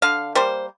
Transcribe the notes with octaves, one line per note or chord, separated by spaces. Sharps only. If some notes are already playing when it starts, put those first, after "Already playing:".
D3 F5
G3 A#3 C5